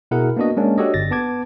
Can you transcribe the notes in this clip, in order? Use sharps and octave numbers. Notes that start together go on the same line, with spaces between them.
B2 E4 G#4 A#4 F#5
A#3 B3 D4 F#4 D#5
G#3 A#3 C#4 D4
D4 F#4 G4 A4 C#5 D#5
G1 A6 A#6
B3 A5 D6 G#6